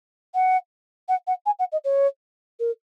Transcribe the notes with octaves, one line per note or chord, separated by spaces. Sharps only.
F#5
F#5
F#5
G#5
F#5
D#5
C#5
A#4